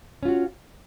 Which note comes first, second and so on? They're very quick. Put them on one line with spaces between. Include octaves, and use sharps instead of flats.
C#4 F4 F#4